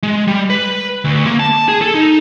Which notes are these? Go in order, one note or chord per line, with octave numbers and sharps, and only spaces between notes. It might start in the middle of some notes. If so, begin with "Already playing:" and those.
G#3
G3
B4
D2
A#3
A5
G#4
A4
D#4